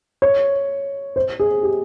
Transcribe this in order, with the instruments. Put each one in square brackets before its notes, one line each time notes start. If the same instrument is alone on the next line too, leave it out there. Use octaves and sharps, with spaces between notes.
[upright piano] C#5
C5
G#4
G4